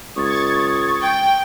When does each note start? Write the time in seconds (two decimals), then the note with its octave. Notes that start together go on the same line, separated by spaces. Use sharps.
0.16 C#2 C#6 D#6 G#6 A6
1.02 G5